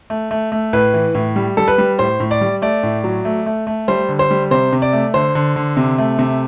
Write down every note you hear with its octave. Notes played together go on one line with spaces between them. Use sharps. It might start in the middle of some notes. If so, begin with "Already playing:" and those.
A3
A3
A3
A2 B4
E3
A2
G3
G3 A4
B4
G3
A2 C5
A2
D5
G3
A3 D5
A2
F#3
A3
A3
A3
G3 C5
D3
C5
G3
C3 C5
C3
D5
A3
D3 C5
D3
D3
C3
A3
C3